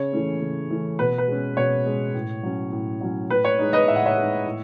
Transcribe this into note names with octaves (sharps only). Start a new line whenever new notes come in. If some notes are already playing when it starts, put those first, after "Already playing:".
Already playing: C#3 C#5
E3 A3 C#4
C#3
E3 A3 C#4
B2 B4
B4
G#3 C#4
B2 C#5
G#3 C#4
A2
F#3 C#4
A2
F#3 C#4
A2 B4
C#5
G#3 D#4
B4 D#5
A2 E5
F#5
C#5 E5
G#3 D#4
A2